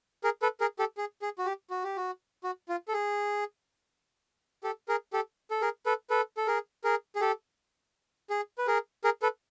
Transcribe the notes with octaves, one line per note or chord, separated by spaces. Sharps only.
G#4 A#4
A4 B4
G#4 A#4
G4 A4
G#4
G#4
F#4
G4
F#4
G4
F#4
F#4
F4
A4
G#4
G4 A4
G#4 A#4
G4 A4
A4
G#4 A#4
A4 B4
A4 B4
A4
G#4 A#4
G#4 A#4
G#4
G4 A4
G#4
B4
G#4 A#4
G#4 A#4
A4 B4